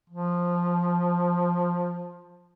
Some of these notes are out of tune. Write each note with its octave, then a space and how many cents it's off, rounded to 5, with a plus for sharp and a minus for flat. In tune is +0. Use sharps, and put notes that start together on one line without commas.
F3 +5